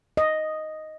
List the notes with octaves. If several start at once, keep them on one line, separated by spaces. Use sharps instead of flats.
D#5